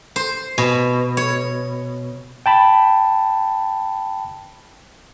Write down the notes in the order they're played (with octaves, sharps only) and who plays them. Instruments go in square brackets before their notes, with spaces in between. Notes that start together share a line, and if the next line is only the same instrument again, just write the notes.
[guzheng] C5
B2
C#5
[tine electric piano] G5 A5 B5